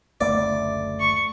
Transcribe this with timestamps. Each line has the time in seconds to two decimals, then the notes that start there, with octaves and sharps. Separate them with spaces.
0.21 F#1 D2 A3 D5
1.00 C#6